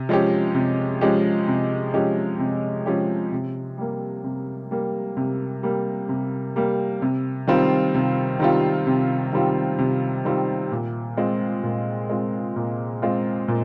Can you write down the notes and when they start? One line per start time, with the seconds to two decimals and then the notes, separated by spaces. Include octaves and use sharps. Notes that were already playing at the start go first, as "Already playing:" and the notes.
Already playing: C3
0.09 F3 G#3 C#4 G4
0.55 C3
1.01 F3 G#3 C#4 G4
1.48 C3
1.94 F3 G#3 C#4 G4
2.39 C3
2.86 F3 G#3 C#4 G4
3.32 C3
3.78 G3 A#3
4.24 C3
4.71 G3 A#3
5.17 C3
5.63 G3 A#3
6.09 C3
6.56 G3 A#3
7.02 C3
7.47 D#3 G3 C4 F4
7.95 C3
8.40 D#3 G3 C4 F4
8.87 C3
9.33 D#3 G3 C4 F4
9.79 C3
10.25 D#3 G3 C4 F4
10.71 A#2
11.17 G#3 C4 F4
11.63 A#2
12.09 G#3 C4 F4
12.56 A#2
13.02 G#3 C4 F4
13.48 A#2